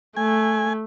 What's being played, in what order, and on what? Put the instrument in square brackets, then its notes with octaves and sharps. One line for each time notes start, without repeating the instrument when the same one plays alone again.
[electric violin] A3 [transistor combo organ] G#5